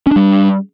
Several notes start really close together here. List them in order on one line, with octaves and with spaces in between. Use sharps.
C#4 D4 G3